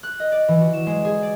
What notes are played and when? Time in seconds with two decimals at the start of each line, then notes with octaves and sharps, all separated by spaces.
0.03 F#6
0.20 D#5
0.32 D5
0.48 E3
0.61 F#4
0.74 E7
0.87 G#3
1.05 G#4
1.23 D5